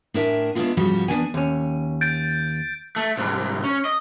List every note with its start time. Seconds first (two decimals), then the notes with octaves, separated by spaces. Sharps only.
0.14 A2 D4 A#4 E5 G#5
0.55 G#3 A3 B3 C4 D4 F4
0.77 G#2 C#3 F3 G3 F#4
1.08 E2 B3 D4 D5 G5 G#5
1.34 D#2 C#4
2.01 G6 A6 D7
2.96 A3
3.17 C2 G#2
3.64 C#4
3.85 D#5